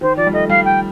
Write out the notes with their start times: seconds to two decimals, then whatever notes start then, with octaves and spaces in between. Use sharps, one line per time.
0.01 D#3 C5
0.17 F3 D5
0.27 G3
0.33 A3 D#5
0.49 G3 F5
0.65 G5